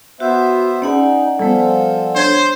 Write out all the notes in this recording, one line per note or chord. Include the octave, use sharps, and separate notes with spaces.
B3 F#4 C5 E5
C#4 D#4 G#4 D5 F#5 G#5
F3 G3 B3 A4
D4 C5 C#5 G#6